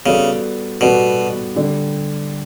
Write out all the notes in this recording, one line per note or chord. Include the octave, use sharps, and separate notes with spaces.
C#3 G3 B3 F#4 A4 D5
B2 G3 B3 F#4 A4 D5
D3 G3 D4 G4